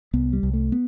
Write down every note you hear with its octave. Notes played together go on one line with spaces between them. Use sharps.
C2 B3
G3
C2
A3
B3